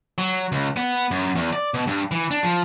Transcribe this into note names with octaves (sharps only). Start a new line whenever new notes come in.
F#3
C#2
B3
F#2
E2
D5
B2
G2
E3
D4
F3